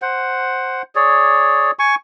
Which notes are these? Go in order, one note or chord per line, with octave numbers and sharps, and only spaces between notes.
C5 F#5
G#4 C#5 D5
G#5 C#6